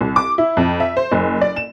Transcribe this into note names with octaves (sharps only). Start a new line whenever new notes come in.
C2
D6
E4
F2
E5
C5
F#1
D5
E7